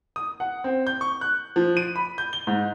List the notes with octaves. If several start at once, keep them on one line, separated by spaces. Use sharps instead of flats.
D#6
F#5
C4
G6
C#6
F#6
F3
D#7
B5
G6
G7
G#2